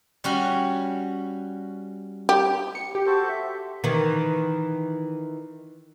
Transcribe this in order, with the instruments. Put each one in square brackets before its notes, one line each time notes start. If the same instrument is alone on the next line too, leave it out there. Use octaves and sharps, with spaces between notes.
[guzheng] G3 C#4 F#4
[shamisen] G4
[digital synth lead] C#7
G4
[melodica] F#4 A4 C5
E5
[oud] D#3 E3